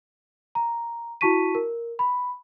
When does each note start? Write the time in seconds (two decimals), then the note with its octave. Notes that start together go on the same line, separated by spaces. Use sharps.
0.55 A#5
1.21 E4 F#4 A5 C#6 B6 D#7
1.55 A#4
1.99 B5